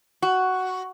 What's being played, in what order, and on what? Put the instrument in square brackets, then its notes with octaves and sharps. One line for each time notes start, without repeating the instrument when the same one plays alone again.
[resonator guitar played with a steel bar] F#4